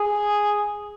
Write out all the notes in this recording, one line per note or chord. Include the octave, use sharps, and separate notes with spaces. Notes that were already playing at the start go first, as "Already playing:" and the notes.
Already playing: G#4